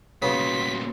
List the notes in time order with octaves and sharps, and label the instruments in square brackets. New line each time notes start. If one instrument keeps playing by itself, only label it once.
[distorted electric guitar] C2 A#2 [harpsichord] C#3 B3 [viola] F#4 C6 [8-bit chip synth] B6